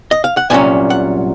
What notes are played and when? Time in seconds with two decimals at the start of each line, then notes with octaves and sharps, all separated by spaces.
0.11 D#5
0.24 F5
0.37 F#5
0.50 C2 A#2 F#3 C#4 G#5
0.90 F#5